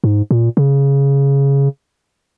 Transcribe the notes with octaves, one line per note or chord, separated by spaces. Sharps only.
G#2
A#2
C#3